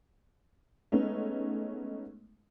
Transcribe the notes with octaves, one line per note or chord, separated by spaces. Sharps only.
G#3 A3 B3 C#4 D#4